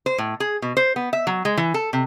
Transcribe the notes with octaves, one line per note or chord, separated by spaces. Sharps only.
C5
A2
G#4
B2
C5
B3
E5
F#3
G#3
E3
A4
C3